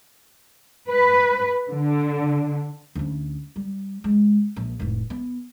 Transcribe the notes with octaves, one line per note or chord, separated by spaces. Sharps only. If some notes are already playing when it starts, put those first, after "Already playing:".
B4
D3
D2 C#4
G3
G#3
A#1
F1 A2
B3